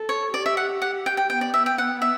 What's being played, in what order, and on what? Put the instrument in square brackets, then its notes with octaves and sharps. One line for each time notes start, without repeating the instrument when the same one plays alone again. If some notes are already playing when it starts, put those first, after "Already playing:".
Already playing: [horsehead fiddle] A4
[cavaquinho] C#5
[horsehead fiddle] G4 [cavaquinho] D5
[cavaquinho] E5
F#5
F#5
G5
G5
[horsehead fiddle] B3 [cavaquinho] G5
[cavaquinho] D5
E5
G5
F#5
E5